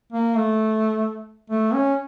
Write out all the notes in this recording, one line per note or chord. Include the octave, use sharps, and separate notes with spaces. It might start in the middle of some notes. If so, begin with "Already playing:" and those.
A#3
A3
A3
C#4